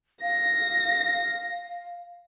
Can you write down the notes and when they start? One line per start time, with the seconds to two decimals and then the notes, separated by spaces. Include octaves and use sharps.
0.22 F5 A#6